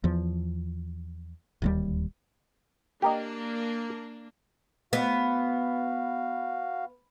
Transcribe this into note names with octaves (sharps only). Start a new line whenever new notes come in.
E2 F3
D1 D#2 G3
A#3 D4 G4 A#4 D#5
B3 F#4 F5